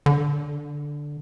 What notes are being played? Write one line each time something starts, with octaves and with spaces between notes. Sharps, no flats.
D3